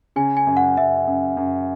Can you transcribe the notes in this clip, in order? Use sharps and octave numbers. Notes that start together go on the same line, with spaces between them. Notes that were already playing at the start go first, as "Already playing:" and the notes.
C#3 G#5
G#5
F#2
F#5
F#2 E5
F#2
F#2